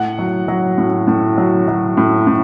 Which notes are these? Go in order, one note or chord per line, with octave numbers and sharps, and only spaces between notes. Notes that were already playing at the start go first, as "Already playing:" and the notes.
Already playing: A2 F#5
F#3
F#3
A2
A2
F#3
F#3
A2
A2